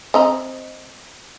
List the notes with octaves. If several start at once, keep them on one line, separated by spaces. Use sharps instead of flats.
C4 D#5 A#5